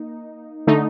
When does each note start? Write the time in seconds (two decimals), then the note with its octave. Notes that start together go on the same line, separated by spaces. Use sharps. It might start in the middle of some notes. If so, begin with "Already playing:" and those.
Already playing: A#3 D#4
0.67 D3 A3 D#4